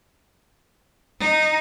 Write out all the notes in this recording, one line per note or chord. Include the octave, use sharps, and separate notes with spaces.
D#4